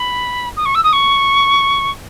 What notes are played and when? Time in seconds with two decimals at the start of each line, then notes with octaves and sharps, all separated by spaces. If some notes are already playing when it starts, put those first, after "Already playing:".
Already playing: B5
0.56 D#6
0.65 C#6
0.75 E6
0.83 D#6
0.93 C#6